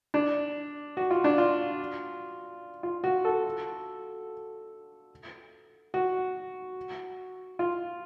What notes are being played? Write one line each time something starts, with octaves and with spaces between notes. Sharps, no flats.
D4
F#4
F4
D4
F4
F4
F#4
A4
F#4
F4